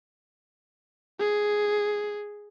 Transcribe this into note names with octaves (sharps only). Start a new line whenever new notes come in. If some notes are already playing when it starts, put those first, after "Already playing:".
G#4